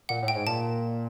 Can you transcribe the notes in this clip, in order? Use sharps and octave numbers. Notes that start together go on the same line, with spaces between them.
A#2 F#5
A2
G5
G#2
A#2 A5